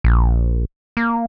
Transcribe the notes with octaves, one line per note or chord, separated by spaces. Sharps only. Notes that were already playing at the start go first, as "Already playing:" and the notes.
A#1
A#3